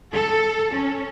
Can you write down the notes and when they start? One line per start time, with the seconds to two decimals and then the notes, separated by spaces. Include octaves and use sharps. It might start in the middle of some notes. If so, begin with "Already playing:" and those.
0.13 A4
0.73 C#4